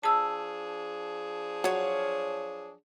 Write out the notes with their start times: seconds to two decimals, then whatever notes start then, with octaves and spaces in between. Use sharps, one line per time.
0.03 F3 D4 G#4 A5 E6
1.64 F#3 C#5 F5